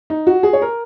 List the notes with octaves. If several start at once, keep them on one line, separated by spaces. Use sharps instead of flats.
D#4
F#4
G#4
C#5
A#4